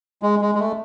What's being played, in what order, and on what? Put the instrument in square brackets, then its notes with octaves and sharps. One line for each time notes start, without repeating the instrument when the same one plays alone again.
[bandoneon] G#3
G#3
G#3
A3